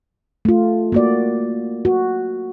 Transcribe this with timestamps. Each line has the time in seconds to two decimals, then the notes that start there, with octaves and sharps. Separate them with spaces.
0.45 A3 F4
0.92 A#3 F#4 D5
1.85 F#4